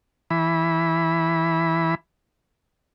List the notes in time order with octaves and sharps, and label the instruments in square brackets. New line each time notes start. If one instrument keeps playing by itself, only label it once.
[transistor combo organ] E3 B5